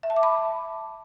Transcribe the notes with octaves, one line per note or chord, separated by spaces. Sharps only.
E5
A5
D6
B5